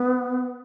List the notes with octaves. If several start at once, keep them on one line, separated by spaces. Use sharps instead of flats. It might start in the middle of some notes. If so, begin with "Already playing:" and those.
Already playing: B3